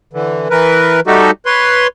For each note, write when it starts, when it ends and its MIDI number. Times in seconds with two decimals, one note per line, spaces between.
0.13 0.48 50
0.13 0.48 52
0.50 1.00 52
0.50 1.00 70
0.50 1.00 71
1.07 1.31 55
1.07 1.31 57
1.07 1.31 63
1.07 1.31 66
1.07 1.31 67
1.07 1.31 69
1.46 1.87 71
1.46 1.87 73
1.46 1.87 84